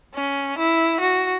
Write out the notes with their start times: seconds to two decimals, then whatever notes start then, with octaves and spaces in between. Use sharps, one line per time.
0.15 C#4
0.58 E4
1.00 F#4